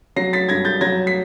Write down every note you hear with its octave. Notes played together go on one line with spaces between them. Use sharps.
F#3 A#6 C7
A6 B6
G2 G#6 A#6
G6 A6
F#3 G#6 A#6
B6